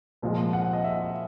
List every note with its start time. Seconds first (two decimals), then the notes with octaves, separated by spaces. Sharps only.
0.22 C2 A#2 F3 G#3
0.53 F#5
0.73 D#5
0.84 E5